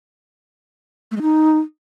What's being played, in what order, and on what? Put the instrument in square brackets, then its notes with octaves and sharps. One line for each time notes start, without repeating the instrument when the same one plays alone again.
[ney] A3
G#3
D#4